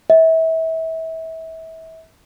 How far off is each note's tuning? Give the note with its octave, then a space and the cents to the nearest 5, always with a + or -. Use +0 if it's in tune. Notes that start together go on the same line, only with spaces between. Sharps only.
E5 -30